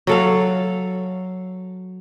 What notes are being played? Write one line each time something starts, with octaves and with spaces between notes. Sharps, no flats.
F#3 A4 F5